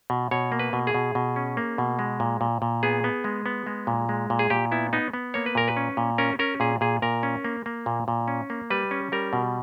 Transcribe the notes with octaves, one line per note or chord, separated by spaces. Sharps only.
B2
B2 C#5
A#3
B4
B2
G#4
B2
B2
C#4
A#3
B2
G#3
A#2
A#2
A#2
B3 G#4
B3
G#3
B3
G#3
A#2
G#3
A#2
G#4
A#2 G4
B3 E4
B3 D#4
B3
A#3 C#5
B4
A#2 A#4
B4
C#4
A#2
C#4 A#4
C#4 A#4
A#2 G#4
A#2 G#4
A#2 A#4
C#4
A#3
A#3
A#2
A#2
C#4
A#3
G3 B4
C#4
G3 A#4
B2